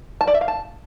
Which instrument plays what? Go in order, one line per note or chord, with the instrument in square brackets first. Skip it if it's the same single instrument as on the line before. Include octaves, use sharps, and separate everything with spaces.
[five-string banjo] A5
D5
E5
F5
A5